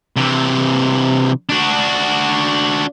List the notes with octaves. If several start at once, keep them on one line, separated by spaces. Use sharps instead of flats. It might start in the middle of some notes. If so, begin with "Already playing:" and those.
C3 E3
D4 F#4